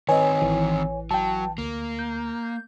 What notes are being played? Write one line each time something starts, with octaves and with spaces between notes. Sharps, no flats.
D#3 C4 B4 C#5 D#5 G#5
A1 E3
F#3 G5 A5
D2 A#3
G6